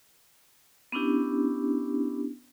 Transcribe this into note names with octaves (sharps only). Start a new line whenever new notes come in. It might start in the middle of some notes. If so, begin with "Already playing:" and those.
B3 C#4 D4 E4 G4